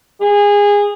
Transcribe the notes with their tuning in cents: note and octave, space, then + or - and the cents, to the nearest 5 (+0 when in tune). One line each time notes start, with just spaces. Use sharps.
G#4 -20